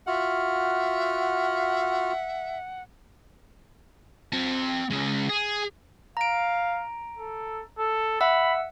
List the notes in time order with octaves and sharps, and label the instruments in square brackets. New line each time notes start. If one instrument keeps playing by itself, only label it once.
[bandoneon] F4 F#4 F6 [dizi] E5 [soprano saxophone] F#5
[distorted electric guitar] C4 A5
C#3 G#3
G#4
[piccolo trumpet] F5 [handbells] A#5 D7
[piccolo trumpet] A4
A4
[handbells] E5 F#5 E6 [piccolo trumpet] B5